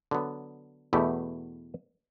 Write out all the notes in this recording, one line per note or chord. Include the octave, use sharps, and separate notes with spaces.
D3 F#3 B3
E2 B2 A3 E4 G4